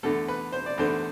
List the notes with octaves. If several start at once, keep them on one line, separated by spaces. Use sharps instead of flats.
E2 D3 A3 A4
B4
C5
D5
E2 D3 A3 C5